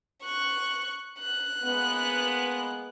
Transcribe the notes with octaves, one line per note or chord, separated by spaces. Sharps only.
C#6 F#6
F#6
G#3 A#3 B3